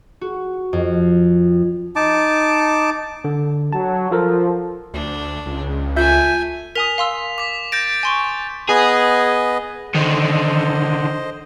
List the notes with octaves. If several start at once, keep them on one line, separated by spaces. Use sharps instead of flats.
F#4
F2
D#4 A5 D6
D3
F#3 A5
F3 F4 A4 A#4
D2 D4
C#2
A3 F4 E5 G#5 G6
A#4 G#5 D#6 B6 F7
F5 C6 E6
D6 B6
G6 A6 A#6 D7
G#5 C6 C#6
B3 G#4 B4 D#5
D3 D#3 C5 D#5